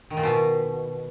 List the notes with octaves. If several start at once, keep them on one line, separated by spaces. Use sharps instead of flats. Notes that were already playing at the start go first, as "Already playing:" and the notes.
D#3
A#2
B2